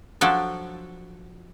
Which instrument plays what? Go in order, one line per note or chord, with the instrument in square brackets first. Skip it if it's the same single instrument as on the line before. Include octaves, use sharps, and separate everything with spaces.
[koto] F3 F#3 D4 A4